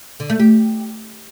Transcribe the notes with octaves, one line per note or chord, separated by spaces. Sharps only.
D3
A3
G4